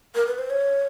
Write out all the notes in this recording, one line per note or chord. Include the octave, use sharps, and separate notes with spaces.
A#4
B4
C5
C#5